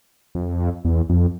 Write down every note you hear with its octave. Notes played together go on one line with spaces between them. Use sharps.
F2
E2
F2